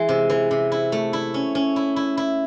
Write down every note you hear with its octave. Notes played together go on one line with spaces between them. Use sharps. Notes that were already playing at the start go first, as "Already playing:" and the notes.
Already playing: E3 G#3
C3
E3
C3
E4
A3
E4
C#4
C#4
E4
E4
E4